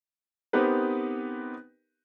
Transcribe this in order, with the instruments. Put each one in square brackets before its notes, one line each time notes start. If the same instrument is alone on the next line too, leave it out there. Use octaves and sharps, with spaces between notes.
[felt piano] B3 C4 D#4 G4 A#4 B4